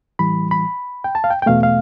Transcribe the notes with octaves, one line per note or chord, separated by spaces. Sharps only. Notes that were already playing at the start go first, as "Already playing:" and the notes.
A2 E3 G3 B5
B5
G5
A5
F5
G5
G5
E2 B2 A3 F5
F5